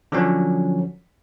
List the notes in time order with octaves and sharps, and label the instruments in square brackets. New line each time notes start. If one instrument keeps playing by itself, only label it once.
[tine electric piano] D3 F3 F#3 C#4